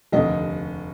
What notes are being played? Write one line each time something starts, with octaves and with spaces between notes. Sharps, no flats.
F1 D#2 D3 D#5